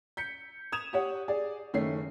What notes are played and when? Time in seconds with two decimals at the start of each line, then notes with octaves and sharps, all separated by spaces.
0.17 G6 B6 C#7
0.72 D#6 G#6 E7 F7
0.93 G4 C#5 F#5
1.28 G#4 D5
1.73 F#1 D#3 A3 C#5 C7